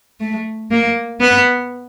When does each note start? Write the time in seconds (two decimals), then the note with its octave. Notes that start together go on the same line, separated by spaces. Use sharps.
0.20 A3
0.71 A#3
1.21 B3